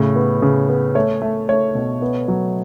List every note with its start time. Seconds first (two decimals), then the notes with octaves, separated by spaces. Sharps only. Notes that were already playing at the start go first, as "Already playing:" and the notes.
Already playing: A2 C#3
0.16 B3
0.42 C#3
0.69 B3
0.95 A3 C#5
1.22 A3
1.49 A3 C#5
1.75 B2
2.02 B3
2.28 F#3